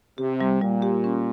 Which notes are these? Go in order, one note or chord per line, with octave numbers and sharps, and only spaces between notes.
C3 G4
G3
A#2 G3
G4
C#4